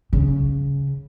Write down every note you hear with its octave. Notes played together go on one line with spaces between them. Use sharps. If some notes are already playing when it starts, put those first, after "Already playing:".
C#3